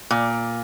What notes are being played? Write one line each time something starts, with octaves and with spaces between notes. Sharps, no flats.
A#2